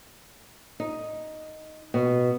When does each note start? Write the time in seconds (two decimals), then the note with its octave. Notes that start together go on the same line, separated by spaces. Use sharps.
0.80 D#4
1.94 B2